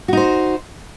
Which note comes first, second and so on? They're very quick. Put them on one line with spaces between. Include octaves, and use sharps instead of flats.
F#4 D#4 C5